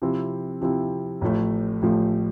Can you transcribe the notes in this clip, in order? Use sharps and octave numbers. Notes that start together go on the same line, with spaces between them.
C3 F3 C4 E4
C3 F3 C4 E4
A1 A2 F3 A3
A1 A2 F3 A3